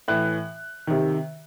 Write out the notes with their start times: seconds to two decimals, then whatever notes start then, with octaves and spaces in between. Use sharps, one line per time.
0.08 A2 E3 F#6
0.87 C3 D#3